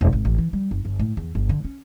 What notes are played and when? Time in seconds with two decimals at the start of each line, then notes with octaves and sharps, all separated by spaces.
0.01 E1
0.13 G#1
0.25 A1
0.38 E3
0.53 G3
0.71 F#1
0.85 G1
0.99 A2
1.17 E2
1.35 G1
1.49 D3
1.64 C#4